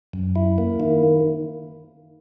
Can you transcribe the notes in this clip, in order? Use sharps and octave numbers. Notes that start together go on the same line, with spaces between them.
F#2
E4
A#3
D#3